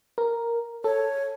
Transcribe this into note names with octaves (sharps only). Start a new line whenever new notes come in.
A#4
A4 C#5